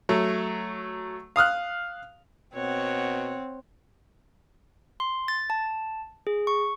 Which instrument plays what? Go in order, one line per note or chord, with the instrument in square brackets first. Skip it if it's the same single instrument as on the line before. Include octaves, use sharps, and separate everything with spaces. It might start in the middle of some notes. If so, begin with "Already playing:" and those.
[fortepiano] F#3 A3
F5 D#6 F6 F#6
[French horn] B2 [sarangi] C4 [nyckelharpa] C#5 F#5
[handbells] C6
A6
A5
G#4
C#6